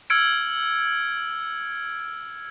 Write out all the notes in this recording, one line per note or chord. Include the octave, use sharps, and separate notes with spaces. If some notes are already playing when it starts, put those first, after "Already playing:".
E6 F6 G#6 C#7 D7